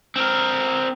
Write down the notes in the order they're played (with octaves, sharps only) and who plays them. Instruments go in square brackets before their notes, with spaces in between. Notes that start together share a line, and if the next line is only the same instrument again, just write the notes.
[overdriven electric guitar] C4 A#4